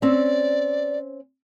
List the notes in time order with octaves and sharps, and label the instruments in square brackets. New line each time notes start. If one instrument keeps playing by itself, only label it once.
[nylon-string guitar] C4 C#4 [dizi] D5